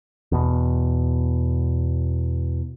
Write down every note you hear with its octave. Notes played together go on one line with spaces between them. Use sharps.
E2 B2